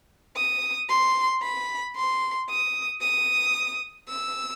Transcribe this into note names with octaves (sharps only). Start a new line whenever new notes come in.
D#6
C6
B5
C6
D#6
D#6
E6